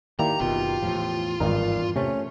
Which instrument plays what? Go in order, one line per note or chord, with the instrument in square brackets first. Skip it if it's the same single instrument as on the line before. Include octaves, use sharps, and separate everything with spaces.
[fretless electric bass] D#3 [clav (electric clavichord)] A#3 E4 D5 [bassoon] G4 [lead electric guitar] A#5
[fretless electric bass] F#1 B2 D#3 [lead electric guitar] F4
[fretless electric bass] E2 A2 F3
[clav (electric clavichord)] G#1 D#4 A#4 [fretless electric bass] E2 G2 [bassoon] A#2
[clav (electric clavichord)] C3 [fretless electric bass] A3 [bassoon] C#4